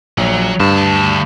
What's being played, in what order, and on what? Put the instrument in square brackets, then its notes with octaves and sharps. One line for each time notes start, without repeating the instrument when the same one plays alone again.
[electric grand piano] A#1 [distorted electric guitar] F#3
[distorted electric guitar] D2 A5 [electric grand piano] G2